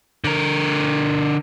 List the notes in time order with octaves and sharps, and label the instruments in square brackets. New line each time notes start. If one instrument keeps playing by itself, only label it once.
[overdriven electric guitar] D3 A#4